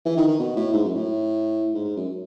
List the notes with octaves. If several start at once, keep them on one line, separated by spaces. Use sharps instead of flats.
E3
D#3
D#3
B2
A2
G#2
F#2
A2
G#2
G#2
F#2